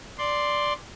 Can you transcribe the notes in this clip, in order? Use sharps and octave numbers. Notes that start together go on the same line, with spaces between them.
D5 C6